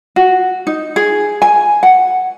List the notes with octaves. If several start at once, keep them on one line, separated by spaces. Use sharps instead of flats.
F#4
D#4
G#4
G#5
F#5